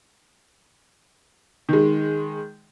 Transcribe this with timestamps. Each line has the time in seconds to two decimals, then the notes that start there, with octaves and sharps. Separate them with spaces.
1.69 D#3 G#3